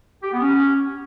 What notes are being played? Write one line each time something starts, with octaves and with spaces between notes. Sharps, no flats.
G4
B3
C#4